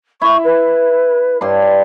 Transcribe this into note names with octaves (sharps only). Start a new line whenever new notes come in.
E4 E5 C#6
B4
G2 D4 C#5 C6